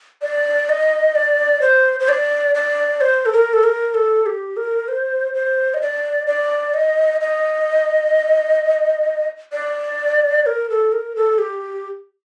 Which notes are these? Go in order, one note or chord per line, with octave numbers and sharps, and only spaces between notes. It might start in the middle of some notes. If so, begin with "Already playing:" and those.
D5
D#5
D5
C5
C5
D5
D5
C5
A4
A#4
A4
A#4
A4
G4
A#4
C5
C5
D#5
D5
D5
D#5
D#5
D5
A#4
A4
A#4
A4
G4